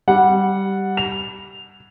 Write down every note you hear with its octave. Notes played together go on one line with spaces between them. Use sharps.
G3 F#5
F7